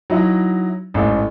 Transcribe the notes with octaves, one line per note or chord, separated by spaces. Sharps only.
F#3 D#4 E4
A1 G#2 A3